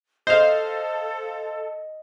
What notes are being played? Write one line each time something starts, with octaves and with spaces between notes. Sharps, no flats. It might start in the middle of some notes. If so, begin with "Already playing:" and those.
A4 C5 D#5 F5